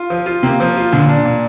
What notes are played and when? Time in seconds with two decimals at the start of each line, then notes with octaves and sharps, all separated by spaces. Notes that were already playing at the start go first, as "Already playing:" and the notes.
Already playing: F4
0.10 F3
0.26 F4
0.43 C3 A#3
0.60 F3
0.77 F4
0.92 A#2 D3
1.08 D4
1.25 A#2